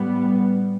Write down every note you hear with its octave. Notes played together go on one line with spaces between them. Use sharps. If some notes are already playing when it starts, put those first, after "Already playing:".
Already playing: A2 G3 B3